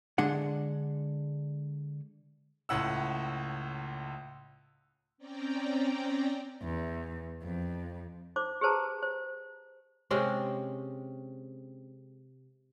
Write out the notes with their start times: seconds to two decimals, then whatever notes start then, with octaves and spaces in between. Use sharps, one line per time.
0.18 D3 G#3 D4 F#5
2.69 C#2 A2 F#5 E6
5.18 C4 C#4 D5 G5 A#5
6.63 E2
7.42 F2
8.36 D#4 C5 D6
8.61 G4 G#4 B4 C5 A5 A#5
9.02 C5
10.11 C3 G#3 C4 C#4